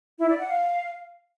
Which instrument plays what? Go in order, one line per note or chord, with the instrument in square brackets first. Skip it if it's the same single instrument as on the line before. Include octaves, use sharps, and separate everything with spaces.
[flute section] E4
D5
F#5
F5